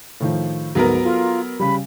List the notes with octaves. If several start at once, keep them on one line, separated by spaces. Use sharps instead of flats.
A2 D#3 F3
D2 G#2 F#3 B3 A#4
F4 A4
C#3 G3 B5